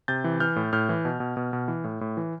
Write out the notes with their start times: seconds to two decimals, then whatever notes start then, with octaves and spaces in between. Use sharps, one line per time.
0.08 C3 G6 A6
0.24 E3
0.40 E3 F6 G6
0.56 A2
0.73 A2 F6 G6
0.89 E3
1.05 B2
1.20 B2
1.37 B2
1.53 B2
1.68 E3
1.84 A2
2.01 A2
2.17 E3